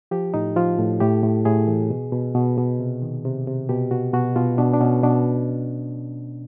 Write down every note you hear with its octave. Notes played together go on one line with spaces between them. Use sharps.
F3 G4
A2 D#4
F3 F4
A2
A2 G4
A2
A2 G#4
E3
B2
B2
B2
B2
C3
D#3
C3
C3
B2 G4
B2 F#4
B2 F#4
B2 F4
B2 D4
D4
B2 C#4
B2 D4